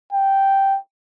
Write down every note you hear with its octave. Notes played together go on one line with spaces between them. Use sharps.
G5